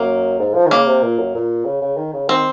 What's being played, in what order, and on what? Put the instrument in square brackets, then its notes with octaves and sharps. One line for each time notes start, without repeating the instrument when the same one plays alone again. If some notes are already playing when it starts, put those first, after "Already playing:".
Already playing: [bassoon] F#2 [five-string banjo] A#3
[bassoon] G#2
F3
D#3
[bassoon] C#3 [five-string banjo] A#3
[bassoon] C3
A#2
F#2
A#2
C#3
C#3
D#3
C#3
[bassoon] D#3 [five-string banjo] C4